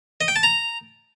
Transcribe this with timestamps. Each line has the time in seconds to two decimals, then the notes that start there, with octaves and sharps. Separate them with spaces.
0.21 D#5
0.28 G5
0.36 A5
0.43 A#5